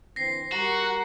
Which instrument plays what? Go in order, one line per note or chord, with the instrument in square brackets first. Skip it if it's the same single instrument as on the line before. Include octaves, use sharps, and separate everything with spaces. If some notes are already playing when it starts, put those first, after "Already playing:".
[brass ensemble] D3 E3 C4 [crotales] A#6 C7
[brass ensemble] G3 A#4 A#5 [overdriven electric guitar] F#4 [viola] G4 F#5